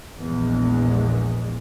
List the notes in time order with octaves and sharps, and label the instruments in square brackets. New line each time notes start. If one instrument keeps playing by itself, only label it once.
[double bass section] A#1 E2 G#3